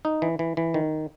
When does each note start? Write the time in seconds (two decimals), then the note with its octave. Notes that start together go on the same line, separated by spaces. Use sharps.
0.05 D#4
0.22 E3
0.39 E3
0.57 E3
0.74 D#3